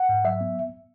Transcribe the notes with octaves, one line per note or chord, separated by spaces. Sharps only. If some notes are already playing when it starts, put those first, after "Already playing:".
Already playing: F#5
G#2
F#3 E5
B3